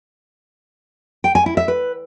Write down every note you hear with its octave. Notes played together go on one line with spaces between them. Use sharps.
G5
G#5
E4
E5
B4